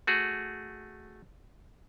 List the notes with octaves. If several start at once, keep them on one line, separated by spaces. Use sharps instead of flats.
A3 F#4 G#4